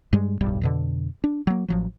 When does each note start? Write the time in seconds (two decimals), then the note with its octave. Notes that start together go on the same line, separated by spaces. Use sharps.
0.13 G2 G3 G#3
0.41 D1 B1 G2 G3
0.61 F2 B2 D3
1.24 D4
1.47 F#3 A#3
1.68 A1 F3 F#3